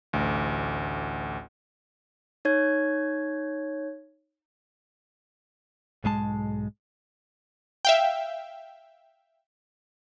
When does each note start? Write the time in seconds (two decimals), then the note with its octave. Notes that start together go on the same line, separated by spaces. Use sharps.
0.13 A1 D2
2.45 D#4 C#5 G#6
6.04 B1 G#2 G#3 A5
7.85 E5 F5 G5